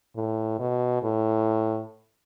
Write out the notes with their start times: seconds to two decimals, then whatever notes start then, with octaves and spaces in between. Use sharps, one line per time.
0.16 A2
0.59 B2
1.03 A2